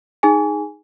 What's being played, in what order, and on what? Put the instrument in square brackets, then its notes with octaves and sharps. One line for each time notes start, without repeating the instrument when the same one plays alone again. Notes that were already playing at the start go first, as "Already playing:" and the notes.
[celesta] D#4 G#4 G#5